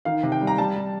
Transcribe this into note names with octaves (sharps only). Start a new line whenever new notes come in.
D#3 F5
C3
G5
G3
A#5
G3 A5
G3